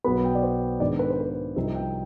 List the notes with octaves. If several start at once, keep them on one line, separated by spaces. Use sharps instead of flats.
B1 B2 B3 B5
G5
D5
C5
G#2 D#3 G#3 B3 D4 D5
B4
C5
B4
C2 C3 F3 C4 D#4 C5
G5